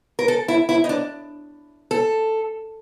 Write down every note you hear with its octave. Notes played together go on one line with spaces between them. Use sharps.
A#4
A4
E4
E4
D#4
D4
A4